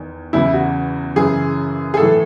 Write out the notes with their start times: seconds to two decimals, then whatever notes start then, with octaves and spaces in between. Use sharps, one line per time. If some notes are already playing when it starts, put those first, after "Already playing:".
Already playing: E2 D#3
0.33 E2 C#3 E3 E4
0.53 F#4
1.16 F#2 C#3 E3 G#4
1.94 G#4
1.97 A2 E3 A4